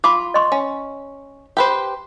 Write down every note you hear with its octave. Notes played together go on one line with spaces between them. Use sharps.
F4 B5 D6
D#5 C6 C#6
C#4
G4 B4 C5